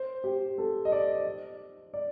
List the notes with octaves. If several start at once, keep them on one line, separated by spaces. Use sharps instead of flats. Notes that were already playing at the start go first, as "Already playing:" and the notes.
Already playing: C5
G4
A4
D#5
D5
D5